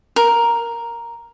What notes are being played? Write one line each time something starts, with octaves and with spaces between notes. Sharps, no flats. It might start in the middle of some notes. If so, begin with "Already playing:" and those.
A#4